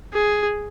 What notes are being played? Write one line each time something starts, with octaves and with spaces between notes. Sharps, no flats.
G#4